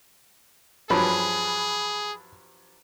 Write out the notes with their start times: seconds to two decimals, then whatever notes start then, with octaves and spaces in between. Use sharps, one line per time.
0.90 G2 F3 F#3 G#4 B5